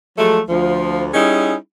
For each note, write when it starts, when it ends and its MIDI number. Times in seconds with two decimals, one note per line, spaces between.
0.18 0.40 53
0.18 0.40 54
0.18 0.40 56
0.18 0.40 57
0.49 1.09 38
0.49 1.09 53
1.14 1.54 55
1.14 1.54 61
1.14 1.54 63
1.14 1.54 64
1.14 1.54 68